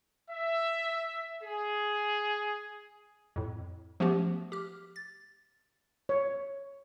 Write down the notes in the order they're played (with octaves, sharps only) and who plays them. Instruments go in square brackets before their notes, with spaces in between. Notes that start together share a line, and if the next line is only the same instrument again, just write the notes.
[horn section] E5
G#4
[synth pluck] F2 A2
F3 A3 B3 C#4 F#4 G4
G4 F6
A6
[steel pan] C#5